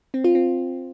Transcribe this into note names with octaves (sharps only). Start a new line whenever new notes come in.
C4
F4
C4